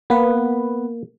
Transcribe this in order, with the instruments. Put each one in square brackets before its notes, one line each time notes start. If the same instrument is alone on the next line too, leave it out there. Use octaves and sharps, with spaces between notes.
[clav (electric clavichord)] A#3 [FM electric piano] B3 B4